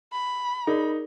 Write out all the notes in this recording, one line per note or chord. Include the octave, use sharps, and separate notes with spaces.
B5
D#4 G#4 A#4 D5